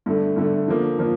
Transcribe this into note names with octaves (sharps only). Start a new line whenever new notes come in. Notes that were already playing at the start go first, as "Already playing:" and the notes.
G2 D3 A3
G2 D3 A3
D3 F3 A#3
D3 F3 A#3